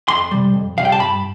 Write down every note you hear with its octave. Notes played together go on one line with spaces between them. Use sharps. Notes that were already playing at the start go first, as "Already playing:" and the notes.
F2 C6
C3 G3
F2
C3 G3 F5
G5
A5
G2 B5